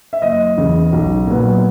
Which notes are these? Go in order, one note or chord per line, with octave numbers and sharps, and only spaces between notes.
E5
F#1 D#5
E2 C#3
B1
A#2 F#3 B3